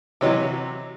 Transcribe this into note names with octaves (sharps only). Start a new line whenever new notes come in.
C3 E3 F#3 G4 C#5 D#5